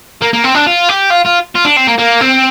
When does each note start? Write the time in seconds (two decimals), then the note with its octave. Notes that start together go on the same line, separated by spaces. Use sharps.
0.22 A#3
0.33 A#3
0.44 C4
0.55 D4
0.66 F4
0.89 G4
1.10 F4
1.25 F4
1.55 F4
1.65 D4
1.77 C4
1.88 A#3
1.99 A#3
2.21 C4